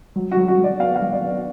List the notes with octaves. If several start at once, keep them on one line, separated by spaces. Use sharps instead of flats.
F#3
F#4
F#3
F#4
F#3
D5
B3 F5
F5
F#3
D5
B3